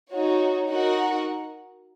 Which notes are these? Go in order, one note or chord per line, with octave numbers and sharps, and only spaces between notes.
D#4 F#4 C#5
D#4 F#4 A#4 F#5